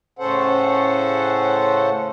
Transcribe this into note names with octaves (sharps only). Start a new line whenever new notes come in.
A2 C#3 C#4 A4 C5 F#5